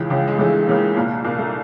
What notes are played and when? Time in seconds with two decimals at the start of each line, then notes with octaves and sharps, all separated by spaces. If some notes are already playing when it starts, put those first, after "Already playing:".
Already playing: C#2 C#3 E3
0.10 C#2 C#3 E3
0.27 G#3
0.38 C#2 C#3 E3 A3
0.67 C#2 C#3 E3 A#3
0.96 C2 A#2
1.24 C2 A#2 A#3
1.38 A3